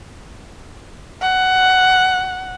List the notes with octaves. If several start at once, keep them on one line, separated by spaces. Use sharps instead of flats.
F#5